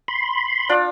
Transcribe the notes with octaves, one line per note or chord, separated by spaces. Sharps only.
B5 C6
D4 F4 D5